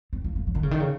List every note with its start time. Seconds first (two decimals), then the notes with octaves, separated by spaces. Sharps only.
0.13 C4
0.24 A#3
0.35 A#3
0.47 F#3
0.55 D#3
0.63 C#3
0.71 D#3
0.80 C#3